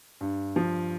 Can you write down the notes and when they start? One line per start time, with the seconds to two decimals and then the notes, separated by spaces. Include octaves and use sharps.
0.21 G2
0.56 F3